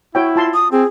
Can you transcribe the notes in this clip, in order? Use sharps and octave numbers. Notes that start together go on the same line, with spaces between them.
E4 F#4 C#5 G5
F4 A5 C6
D#6
C4 G#4